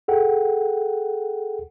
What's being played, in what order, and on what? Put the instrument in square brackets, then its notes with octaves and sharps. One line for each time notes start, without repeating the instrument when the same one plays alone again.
[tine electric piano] G#4 A4 F#5 G5